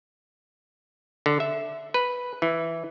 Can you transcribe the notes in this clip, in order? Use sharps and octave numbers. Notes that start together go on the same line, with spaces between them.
D3
E5
B4
E3